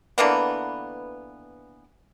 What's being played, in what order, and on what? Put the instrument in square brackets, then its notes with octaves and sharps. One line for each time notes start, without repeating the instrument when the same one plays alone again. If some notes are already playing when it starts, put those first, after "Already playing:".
[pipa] D3 E3 A#3 B3